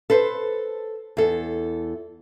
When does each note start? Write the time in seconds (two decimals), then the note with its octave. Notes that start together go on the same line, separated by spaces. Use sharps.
0.10 A4 B4 C5
1.17 E2 A4